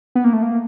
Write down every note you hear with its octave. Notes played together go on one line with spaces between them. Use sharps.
B3
A#3
A3
A#3